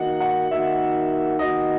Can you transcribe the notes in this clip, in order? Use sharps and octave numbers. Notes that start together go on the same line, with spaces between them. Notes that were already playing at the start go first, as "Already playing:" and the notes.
Already playing: D#3 A#3 D#4 F#4 F#5
F#5
D#3 A#3 D#4 F#4 E5
D#3 A#3 D#4 F#4 D#5